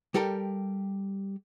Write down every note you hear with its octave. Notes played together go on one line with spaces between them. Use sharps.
G3 G4 A4 A#4 G5